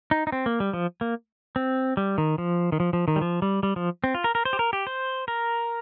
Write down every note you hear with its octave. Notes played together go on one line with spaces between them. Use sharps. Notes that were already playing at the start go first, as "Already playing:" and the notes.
D#4
D#4
C4
A#3
G3
F3
A#3
C4
G3
D#3
F3
D#3
F3
F3
D#3
G3
F3
G3
G3
F3
C4
F4
A#4
A#4
C5
G4
A#4
G4
C5
A#4